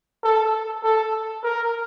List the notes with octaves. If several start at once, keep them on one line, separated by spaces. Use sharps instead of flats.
A4
A4
A#4